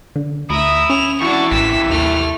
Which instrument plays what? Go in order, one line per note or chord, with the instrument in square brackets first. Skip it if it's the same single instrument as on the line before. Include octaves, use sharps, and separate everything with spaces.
[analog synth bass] D3
[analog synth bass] D2 [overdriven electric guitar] E4 [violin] E5 A#5 [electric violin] D#6
[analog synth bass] C#4 [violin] F7
[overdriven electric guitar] E2 F#4 [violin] D4 C#6 [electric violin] E4
[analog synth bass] A1 [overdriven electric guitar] C3 E3 [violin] B6 E7
[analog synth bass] D#2 [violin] A3 F6